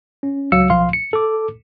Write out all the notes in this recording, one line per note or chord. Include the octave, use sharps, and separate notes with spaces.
C#4
C#2 F#3 F5 E6 C#7
B1 F3 F5 C6
C#7
A4 D6